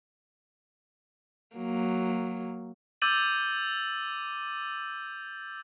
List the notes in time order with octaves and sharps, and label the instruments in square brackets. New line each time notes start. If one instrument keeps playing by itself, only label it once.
[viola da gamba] F#3 A#3
[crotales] D6 E6 G6 A6 D#7 F#7